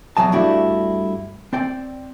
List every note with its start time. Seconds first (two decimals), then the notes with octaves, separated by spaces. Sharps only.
0.17 E2 B2 F#3 D#5 A5
0.32 G2 A3 D4 E4 F#4 G4
1.53 C4 D5 G5